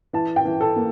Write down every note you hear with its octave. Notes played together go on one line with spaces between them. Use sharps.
E3 A5
G5
E3
A4
A#3